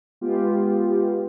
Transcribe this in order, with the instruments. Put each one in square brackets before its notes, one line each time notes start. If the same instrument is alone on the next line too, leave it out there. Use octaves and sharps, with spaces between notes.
[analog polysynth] G#3 B3 F4 G4